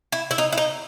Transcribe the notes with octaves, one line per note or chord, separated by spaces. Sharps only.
E4
E4
D#4
E4
D#4